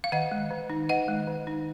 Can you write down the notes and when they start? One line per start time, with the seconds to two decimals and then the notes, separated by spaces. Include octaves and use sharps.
0.04 F5
0.12 D#3 D#5 F#5
0.32 G#3
0.51 D#3
0.70 D#4
0.89 D#3 D#5 F#5
1.08 G#3
1.27 D#3
1.47 D#4